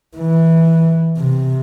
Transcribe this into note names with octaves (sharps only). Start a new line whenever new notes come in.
E3
C3